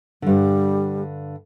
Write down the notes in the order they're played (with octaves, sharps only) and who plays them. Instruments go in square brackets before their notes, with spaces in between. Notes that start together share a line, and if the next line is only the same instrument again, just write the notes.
[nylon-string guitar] G2 D3 [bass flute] G3